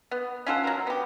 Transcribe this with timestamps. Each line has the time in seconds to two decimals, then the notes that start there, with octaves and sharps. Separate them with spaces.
0.11 B3
0.46 C#4 F4 A4 F#5
0.64 F#3 A#4
0.87 B3 G4